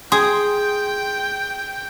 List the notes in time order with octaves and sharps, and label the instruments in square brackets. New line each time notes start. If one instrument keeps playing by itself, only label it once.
[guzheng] G#4 [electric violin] G5 [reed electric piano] C6